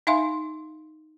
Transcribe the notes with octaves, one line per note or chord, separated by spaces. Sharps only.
D#4 E5 F5 G#5 C6